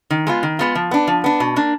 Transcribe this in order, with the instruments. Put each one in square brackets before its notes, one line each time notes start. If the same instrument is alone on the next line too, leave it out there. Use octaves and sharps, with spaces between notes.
[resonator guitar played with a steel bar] D#3
G#3 B3 F4
D#3
G#3 B3 F4
F3
B3 D4
F3
B3 D4
B2
A#3 D4